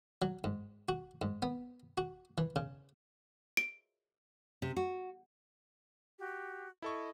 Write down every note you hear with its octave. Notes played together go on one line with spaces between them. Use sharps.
F#3
G#2
F#4
G#2
B3
F#4
E3
C#3
D7
C3
F#4
F#4 G4
E4 A4 D#5 C#6